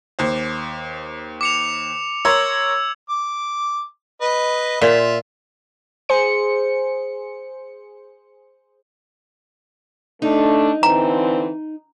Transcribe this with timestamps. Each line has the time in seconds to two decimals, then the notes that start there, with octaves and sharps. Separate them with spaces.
0.19 D#2 C5
1.41 D6 C#7 F7
2.25 A#4 C#5 C6 E6 G#6
3.09 D6
4.22 B4 D#5
4.82 A#2 F4 E5
6.09 G#4 C5 C#7
10.22 A3 D4 D#4
10.83 D3 E3 C4 A#5